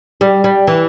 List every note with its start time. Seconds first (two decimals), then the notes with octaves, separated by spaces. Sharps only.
0.21 G3
0.44 G3
0.67 E3